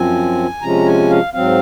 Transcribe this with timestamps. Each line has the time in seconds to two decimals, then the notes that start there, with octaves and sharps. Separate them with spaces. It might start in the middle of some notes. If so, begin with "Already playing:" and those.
Already playing: F#2 F3 C4 G#5
0.61 C3 F3 G#3 C#4 A#5
0.86 G#5
1.10 F5
1.33 G#2 F#3 C4 F5